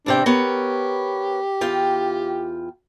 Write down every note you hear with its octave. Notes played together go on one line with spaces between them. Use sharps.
E2 C3 D4 G5
B3 G4 A#4 C#5
E2 F4 G5